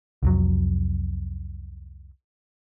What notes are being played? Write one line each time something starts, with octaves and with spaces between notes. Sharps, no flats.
C2 F2 F#3